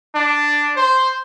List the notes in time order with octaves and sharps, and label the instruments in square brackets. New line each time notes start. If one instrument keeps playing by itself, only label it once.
[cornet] D4
C5